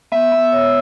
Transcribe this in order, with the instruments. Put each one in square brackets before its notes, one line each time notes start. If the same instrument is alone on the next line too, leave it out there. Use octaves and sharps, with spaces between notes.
[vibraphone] B3 [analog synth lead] E5
[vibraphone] B3
C#5